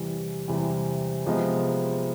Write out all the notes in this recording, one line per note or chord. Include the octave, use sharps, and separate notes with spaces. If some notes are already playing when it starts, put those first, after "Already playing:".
Already playing: E2 C3 E3 G3
E2 C3 E3 G3
C3 F3 G#3 B3 D#4